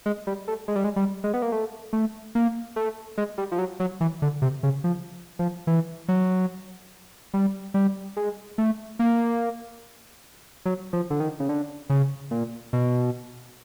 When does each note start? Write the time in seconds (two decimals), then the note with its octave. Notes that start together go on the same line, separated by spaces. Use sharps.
0.06 G#3
0.27 G3
0.48 A3
0.68 G#3
0.76 G3
0.84 G#3
0.96 G3
1.24 G#3
1.34 B3
1.42 A#3
1.52 A3
1.93 A3
2.35 A#3
2.76 A3
3.18 G#3
3.38 G3
3.52 F3
3.59 F#3
3.80 F#3
4.00 E3
4.22 D3
4.42 C3
4.63 C#3
4.84 F3
5.39 F3
5.67 E3
6.08 F#3
7.34 G3
7.74 G3
8.17 G#3
8.58 A3
8.99 A#3
10.65 F#3
10.93 F3
11.10 D3
11.20 D#3
11.40 C#3
11.49 D3
11.90 C#3
12.31 A#2
12.73 B2